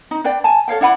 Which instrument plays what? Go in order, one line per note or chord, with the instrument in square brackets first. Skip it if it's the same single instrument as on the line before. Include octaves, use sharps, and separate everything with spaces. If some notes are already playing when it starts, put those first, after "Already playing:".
[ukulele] D#4
D4 B4 D5 G5
G#5 A5
A4 C#5 F5 G5
D4 E4 F#5 B5